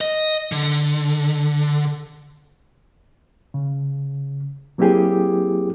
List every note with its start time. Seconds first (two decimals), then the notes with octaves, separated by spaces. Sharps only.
0.01 D#5
0.52 D3
3.54 C#3
4.78 F#3 A#3 C4 E4 G4 G#4